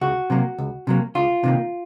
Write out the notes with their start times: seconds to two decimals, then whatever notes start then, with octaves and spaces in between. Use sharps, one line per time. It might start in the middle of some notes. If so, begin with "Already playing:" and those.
0.01 C#2 F#4
0.30 C3 F#3 A#3
0.58 C#2
0.87 C3 F#3 A#3
1.15 C#2 F4
1.44 C3 D#3 A#3